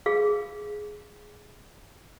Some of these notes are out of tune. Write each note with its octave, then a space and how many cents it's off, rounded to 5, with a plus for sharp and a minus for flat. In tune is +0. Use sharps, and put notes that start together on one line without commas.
G#4 +5 F5 +0